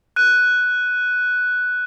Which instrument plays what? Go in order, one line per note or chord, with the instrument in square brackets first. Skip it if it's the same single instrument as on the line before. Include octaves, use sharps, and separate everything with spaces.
[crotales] F#6 D#7